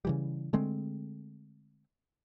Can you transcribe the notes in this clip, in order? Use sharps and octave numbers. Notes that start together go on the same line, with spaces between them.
C#3 E3 G3
D3 G#3 A3 C4